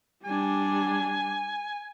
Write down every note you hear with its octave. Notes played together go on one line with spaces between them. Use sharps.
G3 D4 G#5